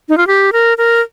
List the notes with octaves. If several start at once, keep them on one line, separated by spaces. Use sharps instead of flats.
D#4
F4
G4
A#4
A#4